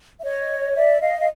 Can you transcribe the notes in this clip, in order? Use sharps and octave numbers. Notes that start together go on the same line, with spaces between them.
E5
C#5 D#5
D#5
D5 E5
D#5 F5
F5